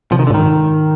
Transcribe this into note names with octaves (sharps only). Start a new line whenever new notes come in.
C3 F3
D#3
D3
G#2 D#3